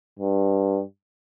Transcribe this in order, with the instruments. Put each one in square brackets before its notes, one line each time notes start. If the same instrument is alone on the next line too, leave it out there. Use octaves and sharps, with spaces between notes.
[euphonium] G2